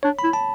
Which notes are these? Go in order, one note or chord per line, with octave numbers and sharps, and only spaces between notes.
D4 C#5
B5
E4
A5